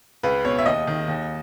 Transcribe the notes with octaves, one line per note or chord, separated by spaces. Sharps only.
C#2 B4
B2 C#5
E5
D#2 D#5
D#3
D#2